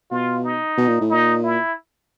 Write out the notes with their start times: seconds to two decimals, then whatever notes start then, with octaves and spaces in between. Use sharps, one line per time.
0.11 B2 F4
0.44 D#4
0.78 B2
0.88 A#2
1.01 A2
1.10 A#2 D#4
1.44 E4